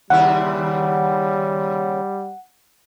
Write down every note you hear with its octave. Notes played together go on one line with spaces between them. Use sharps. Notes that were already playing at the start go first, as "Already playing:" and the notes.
D#2 C#3 G3 E4 F#5